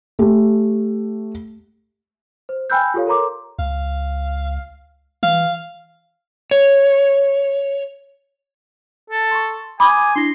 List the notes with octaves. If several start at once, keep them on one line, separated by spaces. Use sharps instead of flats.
A3 G4
C5
G5 G#5 B5 E6 F#6 G6
F4 G4 A4 C#5 F5
A4 A#4 C#5 A#5 C6 D6
C#2 F5
E3 F5
C#5
A4
C6 C#6
G#5 B5 D6 D#6
D4 E4 C6 A#6